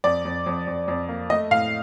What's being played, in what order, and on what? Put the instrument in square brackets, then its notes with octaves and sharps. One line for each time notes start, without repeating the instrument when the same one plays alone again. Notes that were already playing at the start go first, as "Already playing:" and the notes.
[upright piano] F2 D5
F2
F2
F2
F2
A#3
A3 D#5
A2 F5